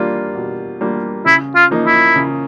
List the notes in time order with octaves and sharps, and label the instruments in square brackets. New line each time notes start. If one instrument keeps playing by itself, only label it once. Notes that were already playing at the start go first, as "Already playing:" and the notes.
Already playing: [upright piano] G3 A#3 D4 F4
B2
G3 A#3 D4 F4
[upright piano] C#3 [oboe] E4
[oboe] F4
[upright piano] F3 A#3 D#4
[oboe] E4
[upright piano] C#3